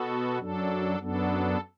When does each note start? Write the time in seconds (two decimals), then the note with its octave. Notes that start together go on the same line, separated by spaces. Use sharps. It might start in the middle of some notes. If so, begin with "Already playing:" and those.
Already playing: B2 B3 F#4 A4
0.39 F#2 F#3 D4 A4
1.00 F#2 F#3 B3 D4 A4